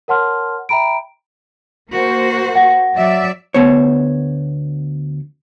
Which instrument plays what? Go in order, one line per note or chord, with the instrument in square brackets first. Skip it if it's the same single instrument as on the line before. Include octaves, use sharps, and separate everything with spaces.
[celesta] A#4 C#5 F#5 A5 C6 F6
E5 G5 A#5 B5 D7
[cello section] A#3 F#4 C5
[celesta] F#5 A#6
[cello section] F#3 D5 E5
[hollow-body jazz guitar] D2 B3 C5 C#5